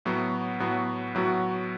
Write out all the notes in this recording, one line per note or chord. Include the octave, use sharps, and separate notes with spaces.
A2 F#3 B3 F#4
A2 F#3 B3 F#4
A2 F#3 B3 F#4